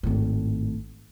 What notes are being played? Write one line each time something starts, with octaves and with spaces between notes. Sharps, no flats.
G#1 A2